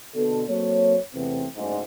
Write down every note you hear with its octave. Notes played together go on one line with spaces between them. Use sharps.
B2 D3 A4
F#3 A#3 C4 A4 C#5
E2 C3 A3 B3 C4
F#1 D2 G#2